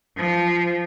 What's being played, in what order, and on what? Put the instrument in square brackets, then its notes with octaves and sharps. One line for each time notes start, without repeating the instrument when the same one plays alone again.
[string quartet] F3